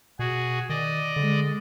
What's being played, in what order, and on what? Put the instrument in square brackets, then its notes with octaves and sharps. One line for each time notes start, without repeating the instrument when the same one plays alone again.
[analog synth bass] B2 [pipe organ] F#4 G#4
[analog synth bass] D#3 [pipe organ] D5 D#5
[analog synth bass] D3 [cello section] G#3